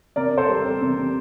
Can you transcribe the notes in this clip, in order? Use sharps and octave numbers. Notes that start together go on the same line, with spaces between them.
C3 A#4 D5
C3
A4 C5
G3
C4 A4
C3
C3